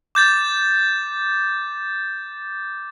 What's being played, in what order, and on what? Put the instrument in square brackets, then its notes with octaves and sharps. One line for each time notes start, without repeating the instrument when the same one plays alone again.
[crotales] D6 G6 A6